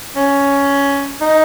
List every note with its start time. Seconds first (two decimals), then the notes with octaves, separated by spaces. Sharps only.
0.16 C#4
1.21 D#4